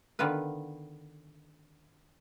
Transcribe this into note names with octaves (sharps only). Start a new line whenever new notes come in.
D3 D#3 B3 F4 B4